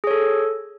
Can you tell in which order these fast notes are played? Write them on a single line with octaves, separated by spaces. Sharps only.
G#4 C#5 A4